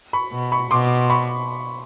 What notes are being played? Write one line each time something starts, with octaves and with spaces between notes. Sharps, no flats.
B5 C#6
B2
B5 C#6
B2 C6 D6
B5 C#6